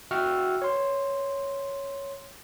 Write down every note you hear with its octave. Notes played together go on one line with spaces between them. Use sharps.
F#4 E5 F#5 G5 E6 F6
C#5 C6